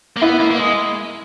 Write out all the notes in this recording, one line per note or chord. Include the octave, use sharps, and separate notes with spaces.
A#3
B3 E4
A#3
A#3
G#3